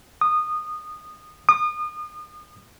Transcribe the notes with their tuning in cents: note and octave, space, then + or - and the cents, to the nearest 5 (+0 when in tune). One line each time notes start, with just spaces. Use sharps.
D#6 -20
D#6 -35